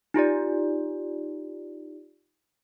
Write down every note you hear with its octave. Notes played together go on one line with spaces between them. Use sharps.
D#4 F4 G4 D5